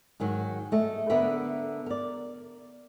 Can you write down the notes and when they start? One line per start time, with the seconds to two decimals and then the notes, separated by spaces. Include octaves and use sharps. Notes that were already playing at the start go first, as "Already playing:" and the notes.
0.20 G#2 D#3 F#3
0.72 A3 D#5
1.10 D3 B3 A#4 B4 E5
1.86 A#4 D5